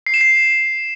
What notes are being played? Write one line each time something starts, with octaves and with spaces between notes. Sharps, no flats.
C7
E7
C7